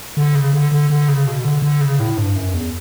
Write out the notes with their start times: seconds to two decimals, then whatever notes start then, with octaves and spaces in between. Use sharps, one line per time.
0.17 D3
0.35 C#3
0.53 D3
0.72 D3
0.90 D3
1.08 C#3
1.26 B2
1.44 D3
1.62 D3
1.81 C#3
1.99 A2
2.17 G2
2.36 F#2
2.54 E2